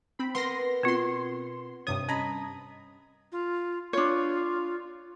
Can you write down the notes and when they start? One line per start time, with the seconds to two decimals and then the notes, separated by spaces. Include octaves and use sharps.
0.19 C4 B5
0.35 B3 A#4 C6 A#6
0.83 B2 C4 F4 C6
1.87 G2 C3 C#5 D#6
2.09 C#4 D#5 A#5 B5
3.32 F4
3.93 D4 F4 C#5